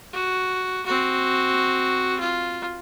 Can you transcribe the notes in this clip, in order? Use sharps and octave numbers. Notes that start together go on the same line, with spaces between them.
F#4
C4 F#4
F4